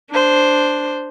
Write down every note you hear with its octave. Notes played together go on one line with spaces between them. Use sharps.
D4 C5